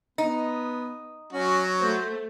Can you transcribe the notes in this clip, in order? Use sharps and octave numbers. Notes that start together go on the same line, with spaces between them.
B3 D#4
F#3 C#4 F#4
A3 C5